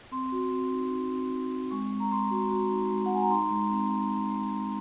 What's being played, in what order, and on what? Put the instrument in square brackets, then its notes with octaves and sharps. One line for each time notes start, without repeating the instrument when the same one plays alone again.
[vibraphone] C4 C6
F#4
C4
D#4
D#4
C4
D#4
C4
G#3 C#6
G#3
A#5
G#3 C6
F#4
F#4
D#4
G#3
F#5
G#3 G#5
A#5
D#4 C6
G#3
C4
G#3
D#4
G#3
G#3